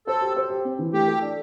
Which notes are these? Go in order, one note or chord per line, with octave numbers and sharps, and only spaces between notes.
A4 C5
G4
C5
G4
C4
E3
A3 G4
A4
D4